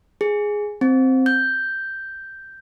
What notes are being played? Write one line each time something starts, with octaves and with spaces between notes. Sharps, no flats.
G#4
C4
G6